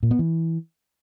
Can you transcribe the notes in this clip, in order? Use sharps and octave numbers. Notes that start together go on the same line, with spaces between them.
A#2
B3
E3